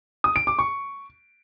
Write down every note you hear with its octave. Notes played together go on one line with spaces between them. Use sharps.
D#6
D7
D6
C#6